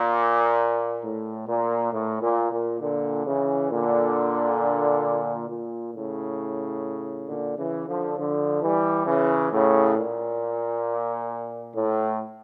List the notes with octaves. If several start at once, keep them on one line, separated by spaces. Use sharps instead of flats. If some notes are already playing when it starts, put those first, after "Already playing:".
Already playing: A#2
A2
A#2
A2
A#2
A#2
A#2 D3
C#3 E3
A#2 D3
A#2
A2 C#3
A#2 D3
C#3 E3
D3 F3
D3 F3
E3 G3
C#3 E3
A2 C#3
A#2
A2